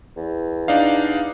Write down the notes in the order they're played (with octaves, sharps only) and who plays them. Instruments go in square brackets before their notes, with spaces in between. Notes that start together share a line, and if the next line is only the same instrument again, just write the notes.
[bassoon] E2
[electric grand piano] D4 D#4 F5